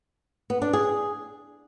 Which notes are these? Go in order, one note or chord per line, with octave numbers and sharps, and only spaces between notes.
B3
D4
G#4